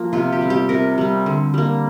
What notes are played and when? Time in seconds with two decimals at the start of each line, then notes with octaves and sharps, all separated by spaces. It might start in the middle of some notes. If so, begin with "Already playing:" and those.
Already playing: F3 A#3
0.13 C3 F4
0.32 G4
0.41 G3 C4
0.50 G4
0.69 C3 A#4
0.98 G3 C4
1.26 D3
1.54 G3 A#3